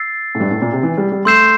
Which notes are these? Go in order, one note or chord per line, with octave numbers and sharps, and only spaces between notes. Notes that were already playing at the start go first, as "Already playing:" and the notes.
Already playing: E6 A6 C7
A2
G2
A2
A#2
C3
E3
G3
G3
A3 C6 E6 G6 C7 E7